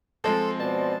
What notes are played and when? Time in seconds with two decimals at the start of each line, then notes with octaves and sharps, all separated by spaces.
0.24 F3 G#3 C4 A4
0.60 B2 C5 D5 A5